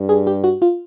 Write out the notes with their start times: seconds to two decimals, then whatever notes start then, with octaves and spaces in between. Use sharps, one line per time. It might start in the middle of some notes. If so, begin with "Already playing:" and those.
Already playing: G2
0.09 G#4
0.27 G4
0.44 F#4
0.62 F4